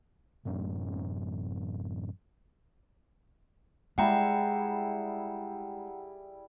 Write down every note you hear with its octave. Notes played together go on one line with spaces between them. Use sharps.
A1 F#2 C#4
G3 G#3 E4 G#4 F#5 G5 A#5